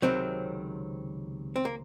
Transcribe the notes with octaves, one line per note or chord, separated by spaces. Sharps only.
C#2 C3 D#3 F#3 C4
C4
A#3